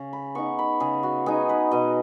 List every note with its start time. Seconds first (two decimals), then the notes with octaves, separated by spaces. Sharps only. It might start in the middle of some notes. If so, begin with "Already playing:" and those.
Already playing: C#3
0.13 B5
0.35 B3 D#4 C#6
0.59 B5
0.80 C#3 G#4
1.03 F#4
1.26 B3 D#4 G#4
1.49 B4
1.71 B2 D#5